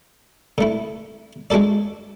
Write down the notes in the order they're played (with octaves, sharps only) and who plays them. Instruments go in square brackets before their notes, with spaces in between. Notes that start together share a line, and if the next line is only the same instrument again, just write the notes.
[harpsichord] D3 A3 E4
G#3 D4 F#4 A4 D5